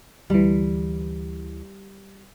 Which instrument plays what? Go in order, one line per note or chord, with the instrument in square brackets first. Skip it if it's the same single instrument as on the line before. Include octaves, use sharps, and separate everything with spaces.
[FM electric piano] D2 E3 [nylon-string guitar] G3